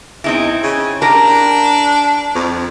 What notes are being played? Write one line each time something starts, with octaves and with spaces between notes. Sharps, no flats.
E2 C4 D#4 E4
C#3
D4 G4 A#4
F2